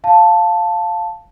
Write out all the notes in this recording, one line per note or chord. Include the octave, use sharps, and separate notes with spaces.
F5 A5